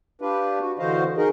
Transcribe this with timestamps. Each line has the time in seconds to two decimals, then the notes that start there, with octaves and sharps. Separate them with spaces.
0.22 D4 F4 G4 B4
0.61 F#4
0.79 D3 E3 F#4 C5 D#5 F5
1.17 D#4 G#4 A#4 D#5